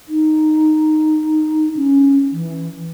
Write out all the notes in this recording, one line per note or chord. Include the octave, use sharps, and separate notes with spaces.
D#4
C#4
E3